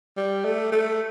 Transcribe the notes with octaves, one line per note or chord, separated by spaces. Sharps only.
G3
A3
A3